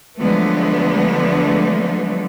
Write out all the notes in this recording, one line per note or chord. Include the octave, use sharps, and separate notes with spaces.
D3 F3 F#3 G#3 A3 B3